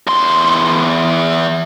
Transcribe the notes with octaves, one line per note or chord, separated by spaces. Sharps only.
E2 C6